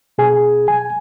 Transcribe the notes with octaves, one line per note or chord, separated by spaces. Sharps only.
B2 G#4 G#5
G#5